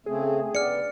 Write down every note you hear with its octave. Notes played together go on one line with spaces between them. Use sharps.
C#3 A3 C4 G#4
B3 D5 F6 C#7